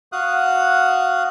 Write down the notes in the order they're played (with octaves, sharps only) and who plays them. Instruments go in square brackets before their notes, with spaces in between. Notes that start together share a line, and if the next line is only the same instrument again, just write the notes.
[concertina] F#4 F5 D#6 F#6